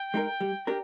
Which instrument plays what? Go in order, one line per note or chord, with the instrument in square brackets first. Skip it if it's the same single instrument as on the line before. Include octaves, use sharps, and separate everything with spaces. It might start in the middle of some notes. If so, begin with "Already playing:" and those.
Already playing: [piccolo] G5
[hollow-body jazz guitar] G#3 D#4 A#4
G3
D4 G4 A#4